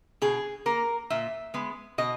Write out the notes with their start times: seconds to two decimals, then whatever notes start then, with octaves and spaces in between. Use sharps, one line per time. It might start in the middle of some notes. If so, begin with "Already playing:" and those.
0.22 B2 G#4
0.66 A#3 A#4
1.10 A#2 E5
1.54 G#3 B3
1.98 B2 D#5